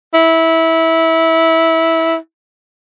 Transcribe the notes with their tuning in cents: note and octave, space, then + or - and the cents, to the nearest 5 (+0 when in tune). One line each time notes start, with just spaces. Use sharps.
E4 -15